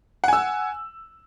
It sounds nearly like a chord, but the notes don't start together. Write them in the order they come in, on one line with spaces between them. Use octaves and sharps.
F#5 G#5 E6